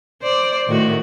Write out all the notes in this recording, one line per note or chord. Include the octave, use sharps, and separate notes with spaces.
C5 D5
A2 D#3 F#4